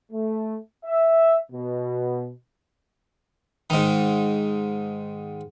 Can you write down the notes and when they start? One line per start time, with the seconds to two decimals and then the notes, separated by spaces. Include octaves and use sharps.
0.12 A3
0.85 E5
1.52 B2
3.70 G#2 D#3